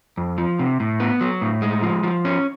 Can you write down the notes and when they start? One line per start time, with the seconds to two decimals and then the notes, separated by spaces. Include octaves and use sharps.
0.17 F2
0.38 F3
0.59 C3
0.80 A2
1.00 B3
1.21 F#3
1.42 A2
1.62 G#3
1.83 F3
2.03 F3
2.25 C#4